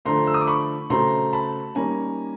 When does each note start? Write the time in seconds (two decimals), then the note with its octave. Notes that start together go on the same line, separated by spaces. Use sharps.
0.05 D3 F3 A3 D4 A#5 C6
0.27 E6
0.34 D#6
0.41 D6
0.47 B5 C#6
0.90 C#3 F#3 A3 C4 A#5 C6
1.33 A5 B5
1.75 D#3 G3 A#3 C#4 G#5 A#5